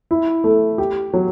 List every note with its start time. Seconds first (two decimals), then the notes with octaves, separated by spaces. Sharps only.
0.11 E4
0.44 A3
0.78 G4
1.13 F#3